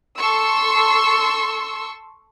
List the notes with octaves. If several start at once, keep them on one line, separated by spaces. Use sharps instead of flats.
A4 C6 C#6 E6